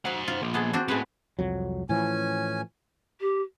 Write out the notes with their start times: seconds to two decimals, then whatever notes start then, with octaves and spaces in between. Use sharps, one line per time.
0.05 F#3 C5 F5 F#5
0.28 F4
0.42 F3 A#3
0.54 B3 G#4 A4
0.73 C4 D4 F#4
0.88 A2 G#3 B3 C4 B4
1.39 C2 F2 F#3
1.89 A2 E3 F3 C#4 G#5
3.21 G4